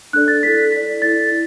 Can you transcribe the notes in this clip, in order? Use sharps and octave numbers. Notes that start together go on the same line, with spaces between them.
D4 A4 D5 F#6
A6
E4 A4 D5 B6
E4 A4 D5 B6
E4 A4 D5 A6
E4